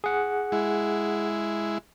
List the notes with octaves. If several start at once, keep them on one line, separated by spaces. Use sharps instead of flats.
G#4 F#5
G#3 E4